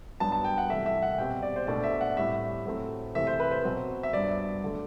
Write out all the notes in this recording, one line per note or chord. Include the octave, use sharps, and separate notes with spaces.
G2 F#3 B3 D4 A5
A5
G5
F#5
C2 C3 E3 A3 E5
E5
F#5
B2 G3 C4 G5
D5
C5
B2 A3 D4 D5
E5
F#5
A2 G3 C4 E5
A2 F#3 A3 C4
C3 E3 A3 C4 E5
C5
B4
C5
B2 F#3 C4
E5
G2 F#3 B3 D5
D3 A3